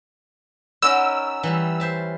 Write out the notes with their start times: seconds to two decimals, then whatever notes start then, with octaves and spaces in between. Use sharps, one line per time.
0.82 C#4 D#4 A#4 D5 F#5 B5 E6
1.43 E3 G3
1.80 C5 E5 A5